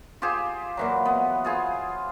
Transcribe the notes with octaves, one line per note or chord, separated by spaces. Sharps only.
F4 G4 G#4 C5
A#2 E3 F#3
B3
F4 G#4 C5